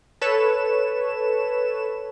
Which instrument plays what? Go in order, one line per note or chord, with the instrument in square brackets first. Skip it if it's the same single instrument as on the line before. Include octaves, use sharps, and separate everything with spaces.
[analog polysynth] A4 B4 C#5 E7